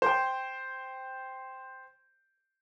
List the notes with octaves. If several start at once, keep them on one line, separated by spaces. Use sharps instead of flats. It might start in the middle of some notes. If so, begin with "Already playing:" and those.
C5 G5